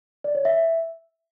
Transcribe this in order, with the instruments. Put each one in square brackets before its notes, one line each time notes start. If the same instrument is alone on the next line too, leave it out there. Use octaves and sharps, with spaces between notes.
[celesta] D5
C#5
E5